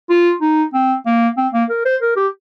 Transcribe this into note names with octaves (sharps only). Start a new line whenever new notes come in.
F4
D#4
C4
A#3
C4
A#3
A#4
C5
A#4
G4